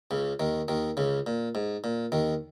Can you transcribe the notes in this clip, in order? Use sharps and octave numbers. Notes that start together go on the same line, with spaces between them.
C#2 C#3
D#2 D#3
D#2 D#3
C#2 C#3
A#2
G#2
A#2
D#2 D#3